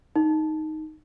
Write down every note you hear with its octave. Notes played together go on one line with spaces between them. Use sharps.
D#4